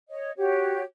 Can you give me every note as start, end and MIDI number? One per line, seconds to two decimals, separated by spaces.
0.09 0.31 73
0.09 0.31 75
0.37 0.82 66
0.37 0.82 67
0.37 0.82 73